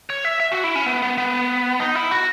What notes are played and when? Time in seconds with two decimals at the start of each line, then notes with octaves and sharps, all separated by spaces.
0.10 C#5
0.25 E5
0.40 E5
0.52 F#4
0.64 E4
0.75 C#4
0.86 B3
1.02 B3
1.18 B3
1.80 D#4
1.95 E4
2.11 F#4